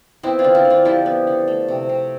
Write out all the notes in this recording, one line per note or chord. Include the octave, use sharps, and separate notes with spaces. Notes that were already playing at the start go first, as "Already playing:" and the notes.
B3 C4 E4
D4 F4
D3
C4 E4
D3
D4 F4
F3 E4 G4
B3
D3
A3
C3
C3